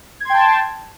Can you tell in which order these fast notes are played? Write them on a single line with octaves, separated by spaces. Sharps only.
G#6 C6 G5 A5